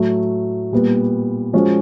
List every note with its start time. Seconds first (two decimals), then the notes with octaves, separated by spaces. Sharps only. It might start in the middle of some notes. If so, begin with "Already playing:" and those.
Already playing: A2 F#3 A3
0.72 A#2 G3 B3
1.53 F3 G#3 C#4 F#4